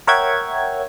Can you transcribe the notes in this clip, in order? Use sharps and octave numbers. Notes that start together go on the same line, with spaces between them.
A#4 C#5 E5 F#5 G5 G#6